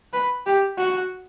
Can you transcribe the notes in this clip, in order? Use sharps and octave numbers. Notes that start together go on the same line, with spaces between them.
B4
G4
F#4